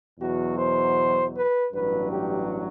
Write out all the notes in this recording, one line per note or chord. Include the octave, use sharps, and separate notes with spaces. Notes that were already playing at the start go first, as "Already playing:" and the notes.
E2 B2 F#3 F#4
C5
B4
A1 G2 F#3 B4
G4